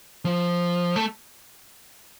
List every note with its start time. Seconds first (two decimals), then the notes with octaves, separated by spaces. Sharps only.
0.25 F3
0.96 A3